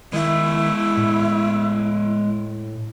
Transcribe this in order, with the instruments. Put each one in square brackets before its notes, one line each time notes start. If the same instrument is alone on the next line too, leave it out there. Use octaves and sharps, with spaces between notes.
[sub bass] D#3 [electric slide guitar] G#3 E5 [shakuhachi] E4
[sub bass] A2